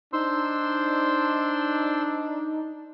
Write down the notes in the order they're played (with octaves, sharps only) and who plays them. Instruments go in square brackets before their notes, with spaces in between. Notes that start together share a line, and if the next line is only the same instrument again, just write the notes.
[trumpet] D4 [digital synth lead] D#4 [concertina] C5 C6 E6